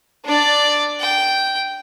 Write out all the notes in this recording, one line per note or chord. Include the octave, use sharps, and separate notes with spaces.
D4 D5
G5